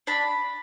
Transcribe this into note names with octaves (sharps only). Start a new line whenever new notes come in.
D4 B5